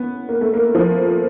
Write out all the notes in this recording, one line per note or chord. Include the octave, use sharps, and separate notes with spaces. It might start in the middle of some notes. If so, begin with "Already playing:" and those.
Already playing: B3 C#4
A#3
A3
A#3
F3